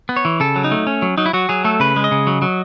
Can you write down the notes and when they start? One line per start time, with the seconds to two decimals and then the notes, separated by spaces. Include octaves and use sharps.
0.09 B3
0.16 C#5
0.25 E3
0.40 C#3 A4
0.56 F#3
0.64 D#4
0.71 A3
0.87 C#4
1.02 F#3
1.18 F#3 D#4
1.26 E4
1.33 F#3 F#4
1.49 F#3 G#4
1.65 A3 A4
1.80 C#3 B4
1.96 G#3
2.04 D#5
2.11 C#3
2.27 F#3
2.42 F#3